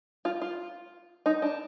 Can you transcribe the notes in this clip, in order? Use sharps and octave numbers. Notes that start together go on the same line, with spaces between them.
F4
F4
D#4
D4